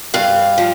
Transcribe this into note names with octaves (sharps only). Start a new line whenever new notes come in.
G2 F5
F3